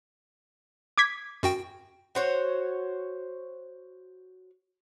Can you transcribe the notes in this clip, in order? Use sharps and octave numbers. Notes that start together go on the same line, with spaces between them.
D6 G#6 B6
F#2 F#4 G5
F#4 C5 C#5